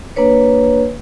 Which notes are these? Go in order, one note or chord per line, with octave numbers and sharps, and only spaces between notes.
A#3 D4 B4 C#5